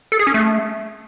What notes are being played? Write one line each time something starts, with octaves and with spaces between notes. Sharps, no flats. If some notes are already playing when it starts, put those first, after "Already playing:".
A4
G#4
C#4
A3